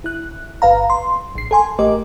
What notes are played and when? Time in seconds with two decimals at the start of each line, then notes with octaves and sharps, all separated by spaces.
0.04 E4 F#6
0.62 G1 B4 F5 A#5
0.90 C6
1.35 A1 C7
1.51 A4 G#5 C6
1.78 A1 A3 G4 A#4 D#5 D6